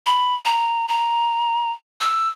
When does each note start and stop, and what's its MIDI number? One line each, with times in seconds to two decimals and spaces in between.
0.06 0.35 83
0.45 0.86 82
0.88 1.71 82
2.01 2.28 88